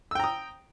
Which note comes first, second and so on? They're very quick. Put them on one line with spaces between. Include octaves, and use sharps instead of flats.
E6 G5 A#5 D#6